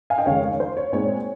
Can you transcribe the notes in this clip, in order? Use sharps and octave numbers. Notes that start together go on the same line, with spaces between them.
F5 G#5
D#5 G5
F1 D#2 C#3 G#3 C#5 F5
C#5
C5
C#5
A#2 G#3 C4 D#4 C#5